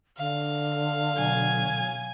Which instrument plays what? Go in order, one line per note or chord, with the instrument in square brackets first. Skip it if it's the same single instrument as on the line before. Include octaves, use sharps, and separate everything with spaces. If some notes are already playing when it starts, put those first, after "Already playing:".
[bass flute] D3 [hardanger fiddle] F5
[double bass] B2 F#3 [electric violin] G#5